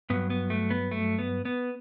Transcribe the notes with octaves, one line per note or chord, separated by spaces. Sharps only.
G2 F#3 B3
B3
A3
B3
A3
B3
B3